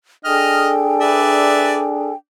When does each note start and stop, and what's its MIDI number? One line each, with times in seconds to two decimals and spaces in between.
0.25 2.15 62
0.25 2.12 68
0.25 2.12 69
0.25 0.71 75
0.25 2.15 79
0.25 2.12 80
0.25 0.71 89
1.01 1.82 71
1.01 1.82 74
1.01 1.82 76